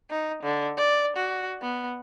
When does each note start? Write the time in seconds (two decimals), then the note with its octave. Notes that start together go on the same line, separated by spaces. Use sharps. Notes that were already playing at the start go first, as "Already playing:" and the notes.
0.10 D#4
0.43 D3
0.77 D5
1.16 F#4
1.62 B3